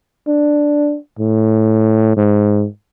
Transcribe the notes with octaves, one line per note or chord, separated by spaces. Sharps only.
D4
A2
G#2